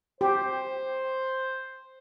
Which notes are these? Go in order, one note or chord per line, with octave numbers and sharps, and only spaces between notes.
G4 C5